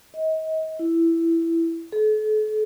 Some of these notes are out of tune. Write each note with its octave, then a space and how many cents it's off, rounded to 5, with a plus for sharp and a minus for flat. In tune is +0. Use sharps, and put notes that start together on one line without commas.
D#5 +35
E4 +10
A4 -40